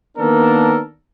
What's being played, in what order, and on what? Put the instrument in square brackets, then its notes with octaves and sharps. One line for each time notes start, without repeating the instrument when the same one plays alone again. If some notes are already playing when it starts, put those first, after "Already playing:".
[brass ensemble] D#3 A#3 B3 D4 A4 A#4